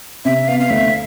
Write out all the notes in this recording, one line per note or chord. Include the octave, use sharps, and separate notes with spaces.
C3 E5
B3 F5
F5
D2 E5